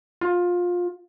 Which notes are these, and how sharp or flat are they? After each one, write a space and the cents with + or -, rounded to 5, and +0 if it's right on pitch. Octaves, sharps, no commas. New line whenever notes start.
F4 +20